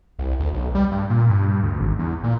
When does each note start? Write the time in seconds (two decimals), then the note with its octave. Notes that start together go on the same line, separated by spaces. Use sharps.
0.19 C2
0.40 D2
0.53 B1
0.75 G3
0.92 G2
1.10 A#2
1.30 G2
1.63 D2
1.80 G#1
1.99 E2
2.23 A#2